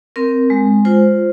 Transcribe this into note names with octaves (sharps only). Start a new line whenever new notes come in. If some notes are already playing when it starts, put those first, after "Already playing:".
C4 A#4
G#3
F4 C5